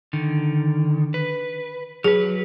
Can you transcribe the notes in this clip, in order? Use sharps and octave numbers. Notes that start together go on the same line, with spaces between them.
D3 D#3
B4
F#3 G#4 B4